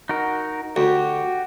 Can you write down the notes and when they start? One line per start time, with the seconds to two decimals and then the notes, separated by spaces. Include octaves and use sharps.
0.09 D#4 F#4 A#4
0.76 D2 F#4 G4